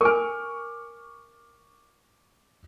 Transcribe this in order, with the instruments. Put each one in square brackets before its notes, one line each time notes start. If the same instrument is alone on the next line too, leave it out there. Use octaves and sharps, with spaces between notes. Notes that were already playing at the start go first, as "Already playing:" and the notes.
[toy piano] A#4 G#5 [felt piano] C#6 D6 F6